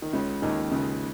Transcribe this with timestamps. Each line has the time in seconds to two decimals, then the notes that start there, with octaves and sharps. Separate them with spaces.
0.02 D#3
0.13 C#2 C#3
0.42 D#2 D#3
0.71 C#2 C#3